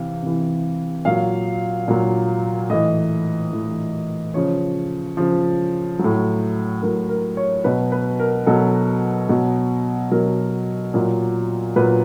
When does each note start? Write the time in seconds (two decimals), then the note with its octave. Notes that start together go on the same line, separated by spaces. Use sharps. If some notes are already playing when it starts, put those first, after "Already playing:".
Already playing: C3 E3 F5
0.22 C3 E3
1.05 A#2 F#3 F5
1.88 A#2 F#3
2.69 A2 E3 D#5
3.52 A2 E3
4.34 C#3 F3 C#5
5.17 C#3 F3
5.99 A2 F#3
6.82 A2 F#3 A#4
7.09 A#4
7.37 C#5
7.64 B2 F#3 B4
7.92 B4
8.19 A#4
8.46 B2 F#3 A4
9.29 B2 F#3
10.11 B2 F#3 A#4
10.94 A#2 F#3
11.76 A#2 F#3 B4